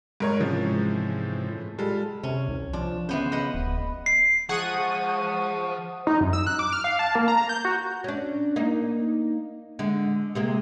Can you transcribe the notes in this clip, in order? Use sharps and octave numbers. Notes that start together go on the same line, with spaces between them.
G#2 A#4 C#5
G#2 C3 E3 F3 G#3 C#4
A2
G3 G#3 F4 A4
C3 C#4
C2
F3 D4
C#3 E3 B3 C5
B4 D#5 F#5
D1
C7
F3 G#3 F#5 C#6 D#6 D#7
D#4
F#2
E6
F#6
D6
F6
F5
A5
A#3
A#5
G6
F#4
C#4 D4
A#3 D#4
D3 G#3
C3 G#3 A#3